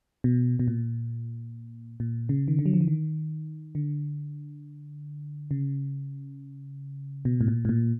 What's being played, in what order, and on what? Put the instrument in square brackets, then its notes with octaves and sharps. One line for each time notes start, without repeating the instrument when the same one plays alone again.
[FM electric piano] B2
B2
A#2
A#2
C#3
D#3
D3
F#3
F3
E3
D#3
D3
C#3
B2
A2
A#2
A2
A#2